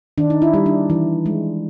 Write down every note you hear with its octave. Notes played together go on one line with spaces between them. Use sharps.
D#3 D4
D#4
E4
G3
D4
E3
G#3